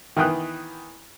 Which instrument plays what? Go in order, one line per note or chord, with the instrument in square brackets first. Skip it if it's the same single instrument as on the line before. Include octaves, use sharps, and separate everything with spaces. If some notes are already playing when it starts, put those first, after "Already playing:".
[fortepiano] D#3 E3 B3 G5 D#6 F#6